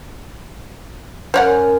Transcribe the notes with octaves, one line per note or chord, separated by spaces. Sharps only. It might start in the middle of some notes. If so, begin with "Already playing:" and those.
F#2 A#4 C5 C#5 F#5